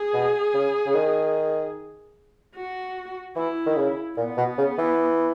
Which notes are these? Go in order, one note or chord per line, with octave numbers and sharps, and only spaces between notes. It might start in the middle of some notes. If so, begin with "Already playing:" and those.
Already playing: G#4
B2
C#3
C#3
D#3
F#4
E3 E4
D#3
C#3
A#2 B3
B2
C#3
E3